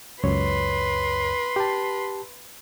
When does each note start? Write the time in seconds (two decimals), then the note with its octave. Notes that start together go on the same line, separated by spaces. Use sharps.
0.24 C#2 F#2 B4 C#5 C6
1.56 G4 A5